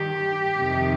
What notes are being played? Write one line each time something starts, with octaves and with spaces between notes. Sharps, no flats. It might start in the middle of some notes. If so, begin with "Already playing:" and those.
Already playing: G2 D#3 G4
F2 C3 D#3